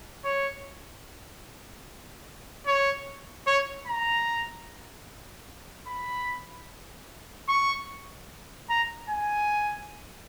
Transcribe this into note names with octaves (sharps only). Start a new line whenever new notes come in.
C#5
C#5
C#5
A#5
B5
C#6
A#5
G#5